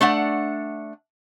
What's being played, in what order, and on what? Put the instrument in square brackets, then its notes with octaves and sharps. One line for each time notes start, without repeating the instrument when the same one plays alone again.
[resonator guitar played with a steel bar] A3 D4 F#5